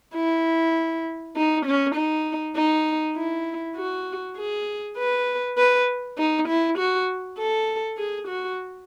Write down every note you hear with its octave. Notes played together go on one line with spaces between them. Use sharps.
E4
D#4
C#4
D#4
D#4
E4
F#4
G#4
B4
B4
D#4
E4
F#4
A4
G#4
F#4